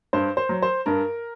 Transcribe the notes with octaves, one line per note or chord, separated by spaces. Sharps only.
G2 C5
C5
F#3
C5
G2 A#4